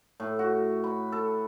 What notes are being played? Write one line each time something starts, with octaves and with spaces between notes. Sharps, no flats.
A2
F#4
B5
A4